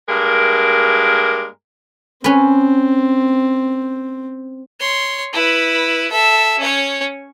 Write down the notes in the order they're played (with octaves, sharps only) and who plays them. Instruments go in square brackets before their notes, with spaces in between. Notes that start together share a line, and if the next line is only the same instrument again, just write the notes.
[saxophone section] G2 G#3 A#3 A#4
[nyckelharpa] C4 [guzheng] C#4 B4
[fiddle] C#5 C6
E4 B4
A4 E5
C#4 C#5